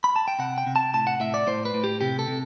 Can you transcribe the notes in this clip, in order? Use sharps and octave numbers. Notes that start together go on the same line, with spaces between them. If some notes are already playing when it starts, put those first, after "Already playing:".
B5
A5
G5
C3 F#5
G5
C3
A5
A2 A5
F#5
A2 E5
D5
A2 C5
B4
A2
G4
C3 G4
A4
C3